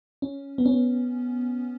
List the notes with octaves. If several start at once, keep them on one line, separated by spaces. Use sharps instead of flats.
C#4
B3
C#4
B3